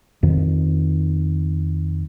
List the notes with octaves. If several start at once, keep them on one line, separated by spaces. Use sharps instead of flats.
F2 D#3